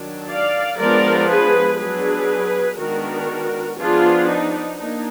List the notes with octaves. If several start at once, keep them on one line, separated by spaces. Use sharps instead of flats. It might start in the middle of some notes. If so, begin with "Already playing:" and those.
Already playing: D#3 F#3 D4
D5 F5
F3 G#3 B3 D4 A#4 D5
G#4 B4
F#3 B3 D4 G#4 B4
D#3 G#3 B3 D4 F#4 A#4
F3 B3 D4 F4 G#4
D#4
A#3 D4 D#4